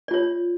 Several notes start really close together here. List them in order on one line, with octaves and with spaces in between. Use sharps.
D5 F4 C#5